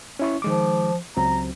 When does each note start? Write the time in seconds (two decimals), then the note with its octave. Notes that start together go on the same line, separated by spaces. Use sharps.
0.19 C#4 E4 C#6
0.42 D#3 F3 G#3 D6
1.17 C#2 F#3 C4 A#5